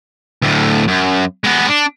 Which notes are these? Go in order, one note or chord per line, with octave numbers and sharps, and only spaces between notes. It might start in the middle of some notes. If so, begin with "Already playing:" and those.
D2 A2
F#2
G#3 B3
D4